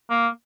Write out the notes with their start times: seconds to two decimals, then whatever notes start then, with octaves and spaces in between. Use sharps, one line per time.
0.10 A#3